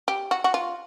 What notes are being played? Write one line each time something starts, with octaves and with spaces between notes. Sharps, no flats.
G4
F#4
F#4
F4